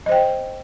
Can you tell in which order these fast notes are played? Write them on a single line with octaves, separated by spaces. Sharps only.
D#5 C5 G5